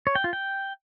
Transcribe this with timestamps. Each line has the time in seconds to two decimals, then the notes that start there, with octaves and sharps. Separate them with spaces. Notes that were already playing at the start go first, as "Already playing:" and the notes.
0.07 C#5
0.15 G5
0.24 F4
0.33 G5